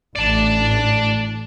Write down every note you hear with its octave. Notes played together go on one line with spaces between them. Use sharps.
A1 D5 A5